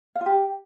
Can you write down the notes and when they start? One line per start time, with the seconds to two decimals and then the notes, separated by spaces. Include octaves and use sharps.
0.15 F5
0.21 F4
0.26 G4